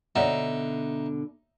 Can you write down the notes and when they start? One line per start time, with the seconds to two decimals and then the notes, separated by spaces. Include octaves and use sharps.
0.16 B2 D3 D#4 C#5 D5 E5 F#5